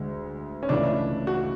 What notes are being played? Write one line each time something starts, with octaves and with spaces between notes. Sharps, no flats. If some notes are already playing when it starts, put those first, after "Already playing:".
Already playing: D2 D3 G#3
C#4
C#2 C#3 E3 A3 D4 E4
F#4